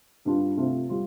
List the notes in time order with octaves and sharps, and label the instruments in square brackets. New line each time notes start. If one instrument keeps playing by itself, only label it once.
[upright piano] G2 G3 D4 F4
C3 A3 C4 F4
G3 F4